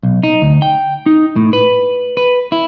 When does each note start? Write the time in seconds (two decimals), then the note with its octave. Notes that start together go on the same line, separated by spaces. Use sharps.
0.03 B1
0.23 D#4
0.42 D2
0.62 G5
1.06 D#4
1.36 A2
1.53 B4
2.17 B4
2.52 E4